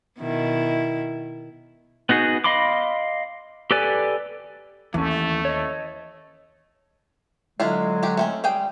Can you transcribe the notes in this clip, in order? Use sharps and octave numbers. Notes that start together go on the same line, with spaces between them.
B2 D#3 E4
B3 D#4 F#4 G#4
D#5 F5 B5 C6 D6
G4 A4 B4 D5 G#5
D#2 E3 A3 C#4
C#5 D#5
D3 F#3 G#3 D4 E4 F4
D4 F#4 G4
A3 C4 C#4
G3 G#4 G5